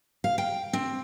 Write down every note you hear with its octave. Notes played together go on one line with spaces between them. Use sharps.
F5
G5
C4